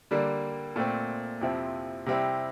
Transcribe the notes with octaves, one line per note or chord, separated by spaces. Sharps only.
D3 G3 A#3
A#2 A3 C4
F2 C3 F3 C4 E4
C3 G3 C4 E4